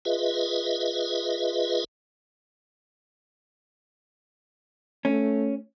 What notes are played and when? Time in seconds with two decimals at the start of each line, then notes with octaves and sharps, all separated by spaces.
0.05 F4 G#4 B4 D#5 E5
5.05 A3 C#4